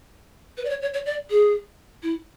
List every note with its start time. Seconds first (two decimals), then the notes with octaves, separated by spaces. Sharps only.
0.57 B4
0.65 D5
0.70 C#5
0.82 C#5
0.94 C#5
1.06 D5
1.30 G#4
2.03 E4